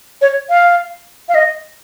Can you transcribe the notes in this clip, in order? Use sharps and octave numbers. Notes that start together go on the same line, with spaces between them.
C#5
F5
F5
D#5